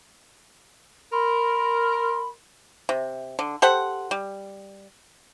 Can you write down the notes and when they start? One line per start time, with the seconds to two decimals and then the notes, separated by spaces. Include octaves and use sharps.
1.12 A#4 B5 C6
2.89 C3
3.39 D3
3.62 G4 A4 C5 F#5
4.11 G3